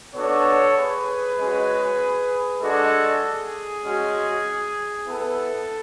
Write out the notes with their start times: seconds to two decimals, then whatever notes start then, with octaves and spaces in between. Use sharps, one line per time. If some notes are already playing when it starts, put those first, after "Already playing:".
0.15 B3 D4 F#4 A4 C#5
0.76 G#4 B4
1.38 G#3 C#4 F#4
2.61 G#3 D4 F#4 A4
3.22 G#4
3.84 G#3 C#4 F#4
5.06 B3 E4 A4